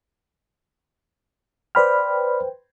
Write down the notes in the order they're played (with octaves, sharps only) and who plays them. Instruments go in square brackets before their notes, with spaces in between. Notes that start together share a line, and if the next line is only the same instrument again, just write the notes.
[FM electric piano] B4 C5 G5 [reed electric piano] D5 B5 F6